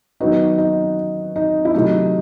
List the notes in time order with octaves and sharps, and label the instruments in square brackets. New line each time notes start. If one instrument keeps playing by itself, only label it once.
[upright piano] D#3 F#3 B3 F#4 [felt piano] D#4
[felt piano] D#4
D#4
E4
[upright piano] C3 D#3 F#3 A3 [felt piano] D#4